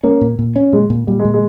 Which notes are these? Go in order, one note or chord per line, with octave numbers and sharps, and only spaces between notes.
A#3 C#4
A#2
A#2
C#4
A#2 G#3
A#2
A#2 G3
G#3
A#2
G#3